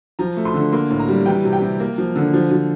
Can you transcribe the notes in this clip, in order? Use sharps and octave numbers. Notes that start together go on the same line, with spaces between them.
F3 A#5
A3
C6
D3
A#3 C6
A2
A#5
G3
E3 G5
C3
G5
C3
A#3
F3
D3
F3
F3